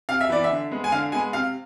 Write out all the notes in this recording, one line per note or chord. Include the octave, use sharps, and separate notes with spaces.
C3 F5
E5
E3 B3 D5
E5
D3
G#3 B3
G#5
D3 F5
G#3 B3 G#5
C3 F5